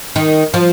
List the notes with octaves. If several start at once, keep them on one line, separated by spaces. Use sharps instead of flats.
D#3
F3